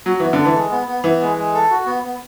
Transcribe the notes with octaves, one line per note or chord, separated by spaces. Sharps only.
F#3 F#4
E3 B3
D3
A4
E3
G#3
B3
B3
E3 B3
G#3
G#3
A4
F#4
B3
B3